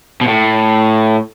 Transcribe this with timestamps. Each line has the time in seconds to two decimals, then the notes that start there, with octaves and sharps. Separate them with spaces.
0.21 B2
0.28 A2